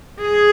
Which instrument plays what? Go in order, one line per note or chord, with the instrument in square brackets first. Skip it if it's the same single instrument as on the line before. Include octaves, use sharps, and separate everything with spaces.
[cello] G#4